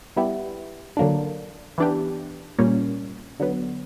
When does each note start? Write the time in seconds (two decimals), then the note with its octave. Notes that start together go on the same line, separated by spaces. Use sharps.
0.16 G3 B3 E4 G4
0.97 D3 F#3 A#3 D4
1.78 E3 B3 D4 G4
2.59 A#2 G3 A#3 C#4
3.40 D3 F#3 B3